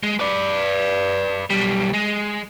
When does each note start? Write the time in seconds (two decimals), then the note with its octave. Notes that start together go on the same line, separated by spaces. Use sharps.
0.03 G#3
0.20 B4 D5
1.50 B1 G3
1.93 G#3